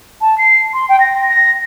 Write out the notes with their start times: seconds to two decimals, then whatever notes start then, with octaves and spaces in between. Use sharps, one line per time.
0.21 A5
0.38 C7
0.73 C6
0.89 G5
1.00 A#6
1.29 A#6